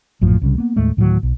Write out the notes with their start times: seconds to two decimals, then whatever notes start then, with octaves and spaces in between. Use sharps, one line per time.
0.21 A#1 F#2 A2 F3
0.42 C2 C#3 G3
0.58 A#3 B3
0.76 D#2 A2 G#3 A3
0.97 D2 A2 D#3 F#3
1.23 B1